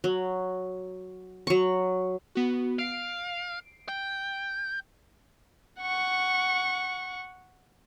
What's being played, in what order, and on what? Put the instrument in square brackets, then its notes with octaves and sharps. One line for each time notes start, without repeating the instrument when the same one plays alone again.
[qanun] F#3
F#3 C#6
[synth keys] B3 F#4
[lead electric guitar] F5 [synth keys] C7 D7
[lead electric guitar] G5
[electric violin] F#5 C#6